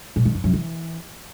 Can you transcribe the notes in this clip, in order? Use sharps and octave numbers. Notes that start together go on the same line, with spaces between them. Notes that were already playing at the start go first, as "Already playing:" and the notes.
A#2
D#3
F2
F#2
E3